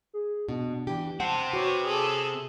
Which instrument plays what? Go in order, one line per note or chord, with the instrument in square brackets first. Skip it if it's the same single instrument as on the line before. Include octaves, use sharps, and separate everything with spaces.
[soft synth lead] G#4
[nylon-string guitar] B2 [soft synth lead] D4
[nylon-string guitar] E3 G4 [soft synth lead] D4
[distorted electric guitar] C3 C4 [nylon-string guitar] F#5 [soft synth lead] A5
[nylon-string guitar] F#4 [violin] B4 C#5 [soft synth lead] D6
[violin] G#4 A4